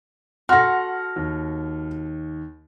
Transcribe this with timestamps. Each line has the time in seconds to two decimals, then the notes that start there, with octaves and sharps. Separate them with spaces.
0.49 F#4 A4 F#5 C6 F6 A#6
1.16 D#2